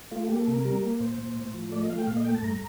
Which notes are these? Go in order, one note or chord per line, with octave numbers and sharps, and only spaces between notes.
A3 F4
A#3 G4
A4
C3
A#4
G3 A#4
A#3
A#2 C5
A#2
A2
F3
A3 D5
D#5
A3 F5
G5
A#2 F5
D#5
A3 G5
A5
G2 A#5